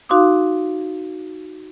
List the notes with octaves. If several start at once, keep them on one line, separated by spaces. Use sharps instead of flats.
D#4 F#4 F5 C6 D6 D#6